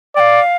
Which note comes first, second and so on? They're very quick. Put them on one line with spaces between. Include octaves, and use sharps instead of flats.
D5 G5 F5